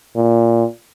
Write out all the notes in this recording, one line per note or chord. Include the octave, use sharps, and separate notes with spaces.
A#2